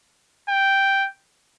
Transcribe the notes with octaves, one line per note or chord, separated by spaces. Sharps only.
G5